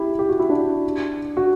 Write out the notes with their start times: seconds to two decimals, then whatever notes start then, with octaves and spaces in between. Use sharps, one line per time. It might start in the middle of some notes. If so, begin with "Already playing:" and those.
Already playing: E4 G4
0.19 G4
0.29 F#4
0.39 E4
0.49 D4 F#4
1.37 F#4